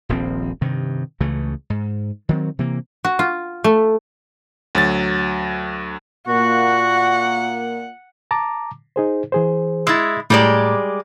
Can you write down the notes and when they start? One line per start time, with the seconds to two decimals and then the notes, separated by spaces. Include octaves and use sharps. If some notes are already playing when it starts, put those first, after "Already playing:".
0.09 D#1 A#1 F3 C4
0.61 G2 C3 D#3
1.20 C#2 C#3 E3 A3
1.70 G#2
2.29 D#3 F#3 G3 C4
2.59 C3 E3 A#3
3.05 F#4
3.19 F4
3.64 A3
4.75 D2 F#3 A6
6.28 A#2 A#3 F#4 F#5
8.31 A5 A#5 D6
8.96 D#4 G#4 C5
9.32 E3 G#4 C5
9.87 G#3 E4 E6 G#6 A6
10.30 A2 G3 G#3 D5 A#5